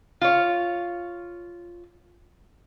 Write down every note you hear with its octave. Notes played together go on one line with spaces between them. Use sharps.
F4 C#5